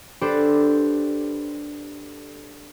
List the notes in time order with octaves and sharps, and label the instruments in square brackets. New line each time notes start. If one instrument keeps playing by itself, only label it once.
[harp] D4 G4 A4 B4 C5